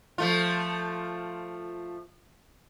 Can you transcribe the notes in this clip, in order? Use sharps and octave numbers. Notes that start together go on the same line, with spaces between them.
F3 A3 F4